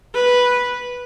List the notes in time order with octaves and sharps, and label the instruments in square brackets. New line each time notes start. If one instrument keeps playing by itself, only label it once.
[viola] B4